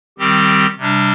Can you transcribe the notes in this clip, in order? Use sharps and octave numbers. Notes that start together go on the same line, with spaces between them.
D#3 G3 C4 G4
C3 G3 D4